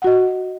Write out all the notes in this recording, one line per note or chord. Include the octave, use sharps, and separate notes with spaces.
F#4 D#5 F#5